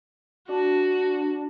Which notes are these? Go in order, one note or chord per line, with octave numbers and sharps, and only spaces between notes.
D4 F#4